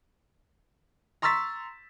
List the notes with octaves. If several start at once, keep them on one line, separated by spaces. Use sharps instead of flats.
A#5 C6 C#6 E6 A6 B6